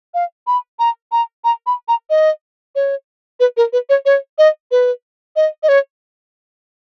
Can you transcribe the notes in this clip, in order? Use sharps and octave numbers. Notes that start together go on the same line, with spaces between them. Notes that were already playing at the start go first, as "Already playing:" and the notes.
F5
B5
A#5
A#5
A#5
B5
A#5
D#5
C#5
B4
A#4
B4
C#5
C#5
D#5
B4
D#5
D#5
C#5